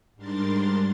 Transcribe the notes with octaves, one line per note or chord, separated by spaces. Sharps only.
G#2 G3 D4 A#4 C6 A6